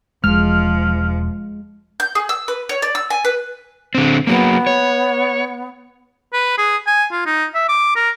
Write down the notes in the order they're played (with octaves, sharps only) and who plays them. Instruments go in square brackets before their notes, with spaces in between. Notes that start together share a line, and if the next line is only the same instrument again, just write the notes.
[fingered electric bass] E1 [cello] F3 [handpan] G#3 [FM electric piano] F6
[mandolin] G6
G#4
E6
B4
C#5
D5
E6
G#5
B4
[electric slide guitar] D3 C4
[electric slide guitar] F#3 A#3 [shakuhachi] B3
[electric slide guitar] C#5
[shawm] B4
G#4
G#5
F4
D#4
E5
D6
A#4